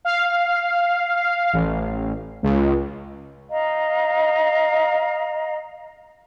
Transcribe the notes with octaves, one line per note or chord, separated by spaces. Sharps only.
F5
A1
C#2
D#5 F5 A#5